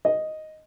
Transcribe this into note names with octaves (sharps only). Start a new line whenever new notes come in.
D#5